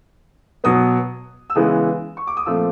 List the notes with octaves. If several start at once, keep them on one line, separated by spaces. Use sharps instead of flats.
B2 F#3 B3 D#6
E6
C#3 E3 G#3 B3 D#6
C#6
D6
D#6
A#2 F3 A3 C4 E6